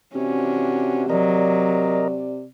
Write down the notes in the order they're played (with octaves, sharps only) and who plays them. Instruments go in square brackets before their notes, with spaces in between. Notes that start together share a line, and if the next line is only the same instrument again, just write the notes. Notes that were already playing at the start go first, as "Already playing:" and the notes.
[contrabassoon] C3 [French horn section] E3 D4 F#4 [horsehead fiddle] C#4
[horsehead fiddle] F#3 [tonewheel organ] A#4 D#5 [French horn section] D5